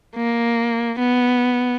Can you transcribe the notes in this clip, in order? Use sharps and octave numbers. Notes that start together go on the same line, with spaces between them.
A#3
B3